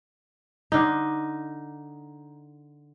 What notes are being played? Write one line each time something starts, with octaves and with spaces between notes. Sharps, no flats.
D3 D#4